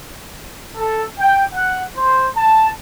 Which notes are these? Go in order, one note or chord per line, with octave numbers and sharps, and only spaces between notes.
A4
G5
F#5
C5
A5